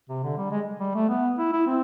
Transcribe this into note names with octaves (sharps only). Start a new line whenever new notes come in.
C3
D3
G3
G#3
G3
A3
B3
E4
E4
C4